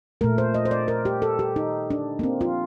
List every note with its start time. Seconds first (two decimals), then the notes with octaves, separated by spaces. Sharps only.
0.21 A#2 A3 A#4
0.38 C5
0.54 D#5
0.65 C5
0.71 D5
0.88 A#4
1.05 G4
1.22 A4
1.39 G4
1.56 D#4
1.90 D4
2.19 A#3
2.23 C4
2.41 F4